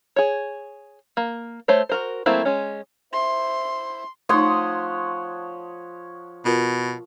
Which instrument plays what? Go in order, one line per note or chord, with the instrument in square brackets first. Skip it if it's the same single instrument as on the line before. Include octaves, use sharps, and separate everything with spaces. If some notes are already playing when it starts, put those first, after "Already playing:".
[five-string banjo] G#4 C#5
A#3
A3 C5 C#5
F#4 A#4 C5
F#3 A3 A#3 C4 E4
G#3 C#4
[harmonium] E4 C5 E5 [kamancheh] C6
[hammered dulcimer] F3 F#5 [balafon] A3 D#4 [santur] C#5 C6 D#6
[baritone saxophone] B2 [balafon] F4 A#4